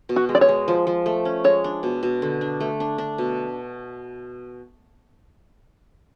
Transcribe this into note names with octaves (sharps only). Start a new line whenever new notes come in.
B2
F#4
G#3
D5
C#5
G#3
F3
F3
A3
C#4
G#3 C#5
D4
B2
B2
D3
D4
A3
D4
D4
B2